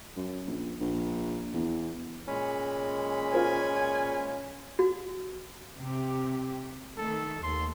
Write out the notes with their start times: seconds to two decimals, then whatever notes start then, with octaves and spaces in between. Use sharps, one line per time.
0.17 F#2
0.47 A#1
0.81 A#1
1.54 E2
2.28 A#2 G#3 C#4 B5
3.32 F4 A#4 C5 G#5
4.79 F#4
5.80 C3 G4
6.98 D#3 A3 A4
7.43 D#2 C6